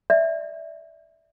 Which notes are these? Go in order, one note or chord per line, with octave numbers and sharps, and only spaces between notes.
D5 E5